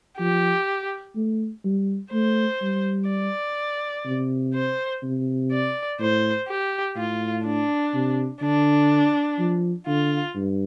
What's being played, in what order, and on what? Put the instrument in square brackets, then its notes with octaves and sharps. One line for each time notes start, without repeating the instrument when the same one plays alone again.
[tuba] F3 [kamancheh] G4
[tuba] A3
G3
[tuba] A3 [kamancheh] C5
[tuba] G3
[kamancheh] D5
[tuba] C3
[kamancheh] C5
[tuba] C3
[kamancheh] D5
[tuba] A2 [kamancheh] C5
[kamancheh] G4
[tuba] A2 [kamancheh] F4
[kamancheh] D4
[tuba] C3
[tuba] D3 [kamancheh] D4
[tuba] F3
[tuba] D3 [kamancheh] F4
[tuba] G2